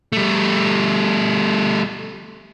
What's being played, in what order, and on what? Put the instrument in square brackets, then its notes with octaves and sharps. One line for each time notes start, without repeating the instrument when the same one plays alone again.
[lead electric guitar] G3 A3